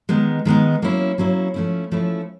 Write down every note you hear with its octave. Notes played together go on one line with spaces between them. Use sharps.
D#3 G#3 B3 D#4
D#3 G#3 B3 D#4
F#3 A#3 C#4 E4
F#3 A#3 C#4 E4
F3 A3 C#4 E4
F3 A3 C#4 E4